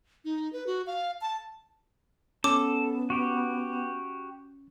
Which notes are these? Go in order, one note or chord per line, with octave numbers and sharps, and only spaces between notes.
D#4
B4
F#4
F5
A5
B3 C#4 A4 D6
F#4 G4